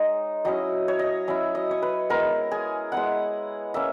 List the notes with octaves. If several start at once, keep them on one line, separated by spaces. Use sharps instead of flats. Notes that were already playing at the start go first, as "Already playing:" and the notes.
Already playing: G#3 D#4 C#5
F#3 C#4 E4 D#5
C#5
D#5
F#3 C#4 E4 E5
D#5
C#5
B4
G#3 B3 E4 A#4
G#4
G#3 B3 E4 F#5
A#3 C#4 E5